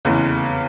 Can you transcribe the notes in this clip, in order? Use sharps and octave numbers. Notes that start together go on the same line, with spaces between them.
F1 E2 C#3 E3